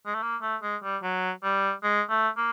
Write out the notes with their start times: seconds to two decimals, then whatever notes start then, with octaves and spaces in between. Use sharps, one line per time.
0.06 G#3
0.14 A3
0.22 A#3
0.42 A3
0.62 G#3
0.83 G3
1.03 F#3
1.43 G3
1.83 G#3
2.10 A3
2.37 A#3